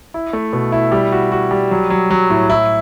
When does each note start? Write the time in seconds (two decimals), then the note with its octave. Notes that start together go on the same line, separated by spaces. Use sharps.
0.14 E4
0.33 A3
0.53 B2
0.72 E4
0.92 G3
1.12 F#4
1.32 F#4
1.51 G3
1.71 F#3
1.90 F#3
2.11 F#3
2.30 A2
2.50 E4